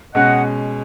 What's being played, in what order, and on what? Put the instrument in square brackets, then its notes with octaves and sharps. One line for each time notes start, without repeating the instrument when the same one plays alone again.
[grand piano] B2 G#3 C#4 [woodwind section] D#5 F#5